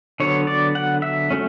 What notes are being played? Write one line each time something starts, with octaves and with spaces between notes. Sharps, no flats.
D3 F#3 B3 C#5
D5
F#5
E5
F#3 A3 C#4